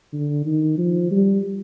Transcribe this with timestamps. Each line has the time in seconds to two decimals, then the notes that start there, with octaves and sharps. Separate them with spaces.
0.13 D3
0.46 D#3
0.78 F3
1.11 G3